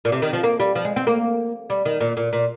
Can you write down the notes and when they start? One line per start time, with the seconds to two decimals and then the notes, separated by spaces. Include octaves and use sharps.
0.05 A#2
0.12 C3
0.22 D#3
0.33 F3
0.43 A#3
0.60 G3
0.75 F3
0.85 G#3
0.96 C4
1.07 A#3
1.70 G3
1.85 D#3
2.01 A#2
2.17 A#2
2.33 A#2